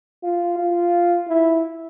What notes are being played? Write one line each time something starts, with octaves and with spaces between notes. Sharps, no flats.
F4
F4
E4